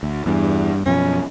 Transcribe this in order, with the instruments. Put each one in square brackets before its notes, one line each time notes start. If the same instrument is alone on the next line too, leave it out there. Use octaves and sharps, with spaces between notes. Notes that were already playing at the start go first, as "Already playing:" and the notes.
[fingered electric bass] D2
[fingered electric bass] E2 [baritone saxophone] G2
[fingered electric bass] F#2 B2 F3 [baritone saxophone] C#4